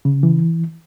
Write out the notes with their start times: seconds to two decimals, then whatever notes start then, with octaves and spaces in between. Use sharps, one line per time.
0.05 C#3
0.23 E3